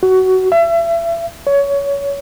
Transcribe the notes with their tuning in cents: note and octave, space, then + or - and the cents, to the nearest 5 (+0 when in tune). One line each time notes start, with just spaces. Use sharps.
F#4 +20
E5 +35
C#5 +20